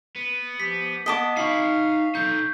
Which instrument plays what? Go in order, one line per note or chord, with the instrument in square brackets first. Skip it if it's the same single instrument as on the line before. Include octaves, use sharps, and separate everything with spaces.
[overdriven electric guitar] B3
[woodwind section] F3 G4 [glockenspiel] B6
[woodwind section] B3 [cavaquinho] D#5 A5 D6 [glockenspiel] B6
[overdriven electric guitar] D#4 B5 [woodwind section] F5 [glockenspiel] C#6 C7
[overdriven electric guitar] D#4 A4 [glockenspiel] G6